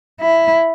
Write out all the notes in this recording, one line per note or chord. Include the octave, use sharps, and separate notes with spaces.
E4